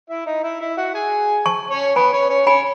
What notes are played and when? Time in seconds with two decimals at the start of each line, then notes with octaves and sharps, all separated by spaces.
0.09 E4 E5
0.26 D#4 D#5
0.44 E4 E5
0.61 E4 E5
0.77 F#4 F#5
0.94 G#4 G#5
1.46 A5 C#6
1.71 C#4 C#5
1.96 B3 B4 G#5 B5
2.13 C#4 C#5
2.29 C#4 C#5
2.46 C#4 C#5 G#5 B5